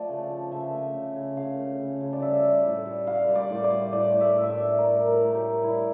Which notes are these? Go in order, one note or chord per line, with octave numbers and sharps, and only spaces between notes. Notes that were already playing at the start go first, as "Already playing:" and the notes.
Already playing: F3 A3 D5
C#3
F3
C#3 E5
A3
C#3
C#3
C#3 F5
A3
C#3
C#3
D5
G3 E5
G3
A2
G3
G3 F5
G3
D5
A2
D5
G3
A2 D5
A2
E5
A2
E5
D5
G3
A2 A#4
A2
A#4
C#5
A2 A#4
G4
G3
G3 E4